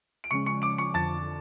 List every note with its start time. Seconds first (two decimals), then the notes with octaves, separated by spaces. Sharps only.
0.24 D7
0.31 C#3 F3 G#3 C#4 C#6 C#7
0.46 C#6 C#7
0.62 D6 D7
0.78 C#6 C#7
0.94 F2 D3 F3 A5 A6